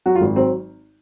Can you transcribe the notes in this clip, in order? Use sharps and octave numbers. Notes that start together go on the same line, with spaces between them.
F#3 F#4
F4
G#1
F#3 C4